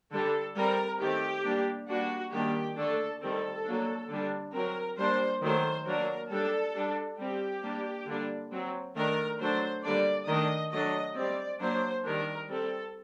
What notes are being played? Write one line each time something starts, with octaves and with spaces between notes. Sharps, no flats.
D3 G3 D4 A4
G3 C4 A#4
D#3 A3 C4 G4
G3 A#3 D4
G3 A#3 D4 F#4
D#3 G3 A#3 D4 G4
D3 A3 D4 A4
D#3 G3 C4 A4
F#3 A#3 D4
D3 G3 D4
F#3 C4 A#4
G3 A#3 D4 C5
D#3 F#3 A3 C5
F#3 A#3 D4 A#4
G3 D4 A4
G3 D4
G3 C4 G4
G3 A#3 D4
D3 G3 A#3 D4
F#3 C4
D#3 A3 D4 A#4
F#3 A3 D4 C5
D3 G3 A#3 D4 D5
D#3 A3 D4 D#5
F#3 A3 D4 D#5
G3 C4 D5
F#3 A#3 D4 C5
D#3 G3 D4 A#4
G3 C4 A4